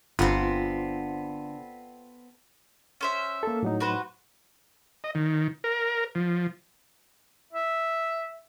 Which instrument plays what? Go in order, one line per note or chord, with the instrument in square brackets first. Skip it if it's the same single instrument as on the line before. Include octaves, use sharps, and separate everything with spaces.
[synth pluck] G1 [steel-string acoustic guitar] D3 [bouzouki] B3 C4 [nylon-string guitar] F4
[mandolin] C#4 C5 E5
[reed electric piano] A#3 A4
A2 F#3 D#4
[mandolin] F#4 B4 C5
[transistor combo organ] D#5
D#3
A#4
F3
[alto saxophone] E5